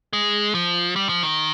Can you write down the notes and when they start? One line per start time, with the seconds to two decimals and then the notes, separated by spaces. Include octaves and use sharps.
0.13 G#3
0.55 F3
0.96 G3
1.09 F3
1.23 D#3